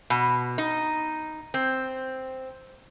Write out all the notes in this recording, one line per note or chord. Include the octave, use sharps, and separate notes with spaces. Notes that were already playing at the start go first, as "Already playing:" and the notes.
B2
D#4
C4